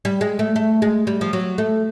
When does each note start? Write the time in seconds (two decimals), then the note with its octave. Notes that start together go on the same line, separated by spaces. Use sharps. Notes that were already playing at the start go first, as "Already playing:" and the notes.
0.05 G3
0.21 G#3
0.39 A3
0.56 A3
0.82 G#3
1.07 G3
1.21 F3
1.33 F#3
1.58 A3